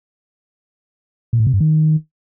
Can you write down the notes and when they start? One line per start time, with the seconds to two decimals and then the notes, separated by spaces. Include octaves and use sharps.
1.33 A#2
1.40 A2
1.47 C3
1.54 G2
1.60 D#3